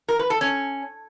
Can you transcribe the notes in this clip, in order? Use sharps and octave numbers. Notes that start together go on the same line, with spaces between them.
A#4
B4
A4
C#4